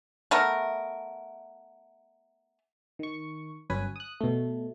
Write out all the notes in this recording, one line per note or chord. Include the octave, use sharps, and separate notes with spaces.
A3 B3 A#4
D#3 C#6
G1 F#2 C#4 B4 G#5
D#6 F#6
B2 A3